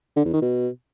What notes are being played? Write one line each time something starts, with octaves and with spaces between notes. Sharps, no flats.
D3
E2
D#3
B2